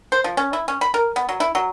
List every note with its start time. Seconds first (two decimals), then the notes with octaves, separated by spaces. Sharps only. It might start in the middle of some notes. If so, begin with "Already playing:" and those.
0.12 C5
0.24 F3
0.37 C#4
0.53 E4
0.68 C#4
0.81 B5
0.94 A#4
1.16 B3
1.29 F#3
1.40 E4
1.55 F#3